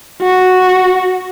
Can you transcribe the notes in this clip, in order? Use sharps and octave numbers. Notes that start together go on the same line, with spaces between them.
F#4